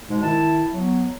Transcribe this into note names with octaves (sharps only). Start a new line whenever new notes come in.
G#2 B2 G#3
D#3 E4 A5
F#3 B3